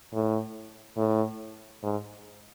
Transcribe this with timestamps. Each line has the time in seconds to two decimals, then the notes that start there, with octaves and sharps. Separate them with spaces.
0.13 A2
0.97 A2
1.83 G#2